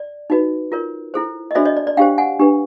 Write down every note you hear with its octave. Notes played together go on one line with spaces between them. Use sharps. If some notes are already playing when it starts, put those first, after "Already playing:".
Already playing: D5
D#4 F#4 B4
F4 A#4 C#5
E4 A4 C5
D#5
D4 F#4 A4 C5 D5 E5
C#5 D#5
D5
D5
D4 G4 C5 F5 G5
F#5 G#5
D4 G4 B4